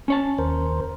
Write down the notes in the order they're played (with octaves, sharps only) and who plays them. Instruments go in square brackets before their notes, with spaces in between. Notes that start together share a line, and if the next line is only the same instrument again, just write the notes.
[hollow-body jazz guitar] C#4 C#5 A5
[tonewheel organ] D#2 A#4 C5